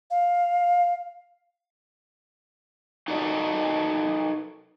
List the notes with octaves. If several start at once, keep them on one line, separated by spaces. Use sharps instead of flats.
F5
D#4 F#4 A4 A#4 D5 D#5